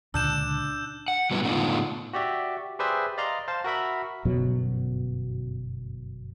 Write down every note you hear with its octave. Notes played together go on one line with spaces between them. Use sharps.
C#2 A#2 D3 D4 E6 G6 E7
F#5
F#3 G3 B3 C#4 E4 B4
A2 D3 B3 D4 D#4 F4
F#4 G4 D5 E5
G4 G#4 B4 C5 D5 E5
D5 D#5 F5 A#5 C6
C5 F5 A5
F#4 A#4 E5 B5
G1 F#2 B2 F#3